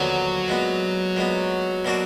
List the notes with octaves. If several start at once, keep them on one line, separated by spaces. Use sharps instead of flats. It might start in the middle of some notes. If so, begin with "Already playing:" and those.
Already playing: D#2 D3 F3 F#3 B3 D4
A#2 G#3 B3
A#2 G#3 B3
B2 A#3 D4 F#4